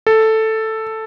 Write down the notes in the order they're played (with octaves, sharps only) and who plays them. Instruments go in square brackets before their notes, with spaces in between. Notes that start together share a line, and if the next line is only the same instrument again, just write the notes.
[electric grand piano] A4